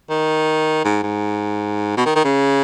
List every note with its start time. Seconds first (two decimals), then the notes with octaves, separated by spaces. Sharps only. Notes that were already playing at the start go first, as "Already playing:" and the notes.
0.10 D#3
0.85 G#2
1.03 G#2
1.97 B2
2.05 D#3
2.16 D#3
2.25 C#3